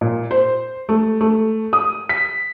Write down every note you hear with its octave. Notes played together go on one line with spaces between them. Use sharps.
A#2
C5
A3
A3
D#6
B6